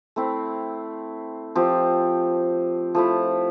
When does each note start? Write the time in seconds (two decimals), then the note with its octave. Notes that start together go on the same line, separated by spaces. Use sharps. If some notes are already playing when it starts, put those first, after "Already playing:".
0.16 A3 C4 E4
1.55 F3 C4 G4
2.95 F3 A3 E4